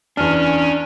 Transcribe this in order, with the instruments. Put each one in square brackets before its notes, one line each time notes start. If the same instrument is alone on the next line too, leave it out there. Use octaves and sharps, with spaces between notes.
[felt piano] E2 F6 [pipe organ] C#4 [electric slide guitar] D4